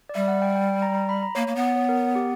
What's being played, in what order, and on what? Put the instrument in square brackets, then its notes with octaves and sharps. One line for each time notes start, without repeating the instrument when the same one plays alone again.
[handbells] D5
[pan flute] G3 [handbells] E5
[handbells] F#5
G5
G5
G5
A#5
A#5
B5
A#5
[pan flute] A#3 [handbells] C#5
[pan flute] A#3
B3
[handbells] C#5
A#4
G4